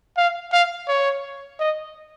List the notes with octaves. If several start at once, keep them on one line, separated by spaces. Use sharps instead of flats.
F5
F5
C#5
D#5